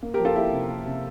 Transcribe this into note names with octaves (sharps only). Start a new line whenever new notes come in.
A#3
G4 A#4
F3
F4 A4
A#3 E4 G4
C3
A#3
C3